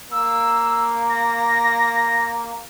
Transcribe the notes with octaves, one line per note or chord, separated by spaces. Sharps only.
A#3 E6
A#6